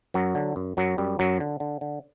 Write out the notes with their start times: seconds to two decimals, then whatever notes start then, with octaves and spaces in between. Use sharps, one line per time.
0.14 F#2 F#3
0.35 D3
0.56 F#2
0.77 F#2 F#3
0.98 F#2 G3
1.19 F#2 F#3
1.40 D3
1.60 D3
1.81 D3